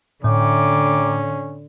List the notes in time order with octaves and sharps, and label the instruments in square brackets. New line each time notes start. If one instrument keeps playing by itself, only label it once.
[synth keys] A2 [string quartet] D3 [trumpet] C#4 [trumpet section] G5 A#5 D6